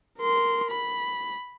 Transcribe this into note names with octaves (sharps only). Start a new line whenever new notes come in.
A#4 C6
B5